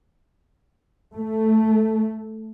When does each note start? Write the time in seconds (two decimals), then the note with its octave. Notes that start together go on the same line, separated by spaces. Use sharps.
1.14 A3